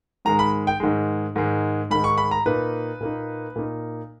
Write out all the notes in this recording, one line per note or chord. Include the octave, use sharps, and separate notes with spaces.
G#2 D#3 G#3 A#5
B5
G5
G#2 D#3 G#3
G#2 D#3 G#3
G#2 D#3 G#3 B5
C#6
B5
A#5
A#2 A#3 D#4 B4
A#2 A#3 D#4
A#2 A#3 D#4